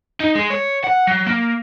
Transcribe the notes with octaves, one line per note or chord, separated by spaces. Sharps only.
D#4
G#3
C#5
F#5
F#3
A#3